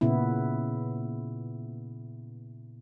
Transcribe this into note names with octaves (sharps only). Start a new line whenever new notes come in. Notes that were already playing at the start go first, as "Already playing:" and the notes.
A#2 C#3 B3 E4